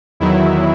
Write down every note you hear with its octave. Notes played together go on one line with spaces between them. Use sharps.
E2 D#3 F#3 E4